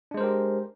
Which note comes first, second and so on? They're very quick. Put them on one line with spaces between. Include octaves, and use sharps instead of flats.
D4 G#3 C5 A#4 G4